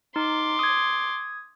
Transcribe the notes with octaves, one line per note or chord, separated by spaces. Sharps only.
D#4 C6 D6
D#6 G#6